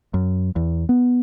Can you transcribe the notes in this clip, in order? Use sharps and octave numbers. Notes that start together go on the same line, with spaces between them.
F#2
E2
B3